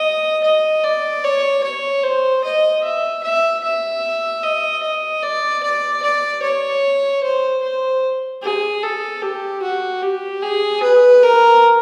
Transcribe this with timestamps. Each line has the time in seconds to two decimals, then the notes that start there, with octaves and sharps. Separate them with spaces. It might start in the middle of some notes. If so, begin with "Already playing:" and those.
Already playing: D#5
0.44 D#5
0.84 D5
1.24 C#5
1.64 C#5
2.03 C5
2.44 D#5
2.84 E5
3.23 E5
3.63 E5
4.43 D#5
4.83 D#5
5.23 D5
5.63 D5
6.02 D5
6.42 C#5
7.23 C5
7.62 C5
8.43 G#4
8.83 A4
9.22 G4
9.62 F#4
10.02 G4
10.42 G#4
10.83 B4
11.23 A#4